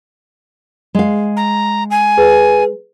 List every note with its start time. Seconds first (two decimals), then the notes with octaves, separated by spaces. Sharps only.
0.95 G#3 F5
1.36 A#5
1.91 G#5
2.17 G#4 B4